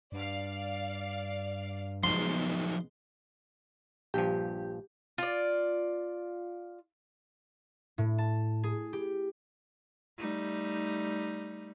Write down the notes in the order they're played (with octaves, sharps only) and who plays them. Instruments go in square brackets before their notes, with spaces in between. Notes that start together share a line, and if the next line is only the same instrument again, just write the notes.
[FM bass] G2 [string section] D5 F5
[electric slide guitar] F3 F#3 D#4 [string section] G#3 B3 [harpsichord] C6
[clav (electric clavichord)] A#1 G2 F3 [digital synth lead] G4
[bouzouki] F4 D5
[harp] A2
A5
G#4
G4
[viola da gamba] G3 A3 D#4